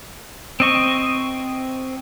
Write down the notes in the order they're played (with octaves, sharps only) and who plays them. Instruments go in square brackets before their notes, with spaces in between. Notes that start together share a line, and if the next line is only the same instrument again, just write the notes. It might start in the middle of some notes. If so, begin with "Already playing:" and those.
[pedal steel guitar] C4 D#5 C#6